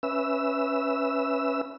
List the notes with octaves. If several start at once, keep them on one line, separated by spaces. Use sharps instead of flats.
C#4 B4 E5 E6